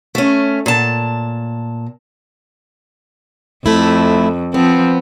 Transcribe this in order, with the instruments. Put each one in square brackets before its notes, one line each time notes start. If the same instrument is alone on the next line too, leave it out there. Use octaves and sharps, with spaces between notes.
[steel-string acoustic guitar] A3 C#4
A#2 A5
[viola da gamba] F2 [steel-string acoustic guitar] A3 E4
[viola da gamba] F3 C4 [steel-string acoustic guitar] B3